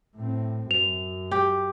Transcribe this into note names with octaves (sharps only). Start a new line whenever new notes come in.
A2 C4
F#2 F7
G4